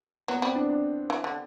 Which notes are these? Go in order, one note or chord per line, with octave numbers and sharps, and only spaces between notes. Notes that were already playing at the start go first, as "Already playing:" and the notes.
F#3 B3
G3 C4
D4
D4
E3
D3